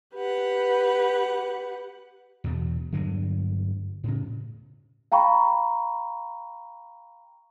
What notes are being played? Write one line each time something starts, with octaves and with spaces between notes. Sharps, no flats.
G4 B4 F#5
E2 B2
G2 D3 F#3 G#3
A2 C#3
F5 G5 A#5 B5 C#6